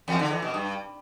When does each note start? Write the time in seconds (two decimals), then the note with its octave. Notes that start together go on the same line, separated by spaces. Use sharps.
0.08 E2
0.19 D3
0.31 E3
0.42 B2
0.54 G2